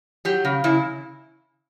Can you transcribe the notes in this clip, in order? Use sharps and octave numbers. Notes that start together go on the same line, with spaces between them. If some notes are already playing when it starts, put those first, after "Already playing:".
F#3 G4
C#3
C#3 E4